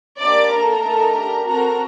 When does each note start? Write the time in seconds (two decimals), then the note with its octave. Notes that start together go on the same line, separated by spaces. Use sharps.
0.19 A#3 D4 G4 D5 D6
0.50 A#3 D4 A4 A#4 A#5
0.82 A3 D#4 A4
1.14 D4 G4
1.45 C4 F#4 A4 A#4 A#5